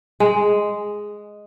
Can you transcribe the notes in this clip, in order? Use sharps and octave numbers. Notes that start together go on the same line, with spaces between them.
G#3